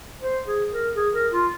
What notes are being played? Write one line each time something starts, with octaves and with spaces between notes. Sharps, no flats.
C5
G#4
A#4
G#4
A#4
F4